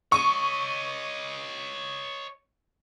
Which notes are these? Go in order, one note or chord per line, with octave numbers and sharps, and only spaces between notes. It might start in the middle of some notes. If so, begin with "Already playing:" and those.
C#5 D#5 C#6